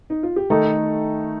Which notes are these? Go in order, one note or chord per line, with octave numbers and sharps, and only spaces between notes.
D#4
F4
G4
D#3 A3 D#4 A4